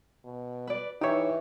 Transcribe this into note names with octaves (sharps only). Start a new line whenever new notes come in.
B2
B4 D5
E3 D#4 G4 C#5 E5